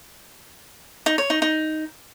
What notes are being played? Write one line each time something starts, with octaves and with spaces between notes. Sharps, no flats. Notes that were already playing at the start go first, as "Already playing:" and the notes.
D#4
C#5
D#4
D#4